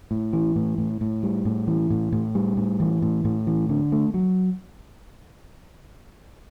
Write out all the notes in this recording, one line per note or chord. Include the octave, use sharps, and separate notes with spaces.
A2
E3
A2
A2
A2
G3
A2
E3
A2
A2
G3
A2
E3
A2
A2
E3
D3
A3
F#3